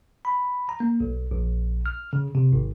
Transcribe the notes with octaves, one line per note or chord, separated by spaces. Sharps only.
B5
A#5
A#3
B1
A#1
F6
C#3
C3
G#1